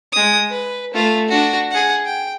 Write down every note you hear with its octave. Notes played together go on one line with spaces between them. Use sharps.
G#3 D#6
B4
A3 F4
D4 F#4
G#4 F#5
G5